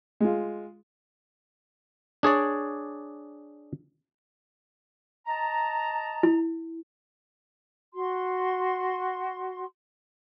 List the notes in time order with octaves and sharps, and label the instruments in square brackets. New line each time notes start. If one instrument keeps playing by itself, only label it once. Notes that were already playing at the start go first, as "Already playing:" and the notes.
[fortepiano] G#3 F4
[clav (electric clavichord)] D4 G#4 C#5 D5
[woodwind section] D#5 A5 A#5
[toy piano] E4
[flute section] F#4 C6